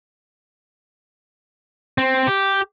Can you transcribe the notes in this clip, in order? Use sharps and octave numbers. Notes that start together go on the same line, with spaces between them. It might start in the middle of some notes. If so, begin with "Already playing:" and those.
C4
G4